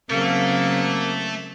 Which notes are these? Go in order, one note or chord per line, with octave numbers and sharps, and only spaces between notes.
C#3 F#3 A3 A#3 C4